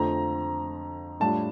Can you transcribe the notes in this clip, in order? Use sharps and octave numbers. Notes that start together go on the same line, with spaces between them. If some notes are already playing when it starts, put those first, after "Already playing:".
Already playing: F2 D3 F3 A3 C4 A#5
A2 G3 D4 F4 A5